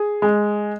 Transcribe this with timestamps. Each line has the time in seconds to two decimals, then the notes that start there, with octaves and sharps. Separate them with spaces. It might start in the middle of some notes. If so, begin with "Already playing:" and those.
Already playing: G#4
0.22 G#3